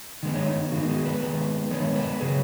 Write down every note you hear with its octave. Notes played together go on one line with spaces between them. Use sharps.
D#3 G#3 B3
C#5
D#4
D#3 G#3 B3 F#4
G#4
B4
D#3 G#3 B3
D#3 G#3 B3 C#5
B4
C#3 F#3 G#4